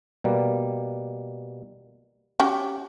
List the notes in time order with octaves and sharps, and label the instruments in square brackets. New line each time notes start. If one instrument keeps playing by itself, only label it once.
[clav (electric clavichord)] B2 G3 A#3
[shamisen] C#4 F#4 G5 [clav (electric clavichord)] G4